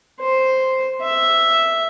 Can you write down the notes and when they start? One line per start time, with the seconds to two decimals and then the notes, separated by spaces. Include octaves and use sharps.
0.20 C5
1.02 E5